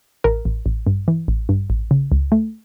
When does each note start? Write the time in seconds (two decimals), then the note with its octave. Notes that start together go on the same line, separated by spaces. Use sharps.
0.24 A1 A#4
0.45 A1
0.66 A1
0.87 G2
1.08 E3
1.28 A1
1.49 G2
1.70 A1
1.91 C#3
2.12 C#2
2.32 A3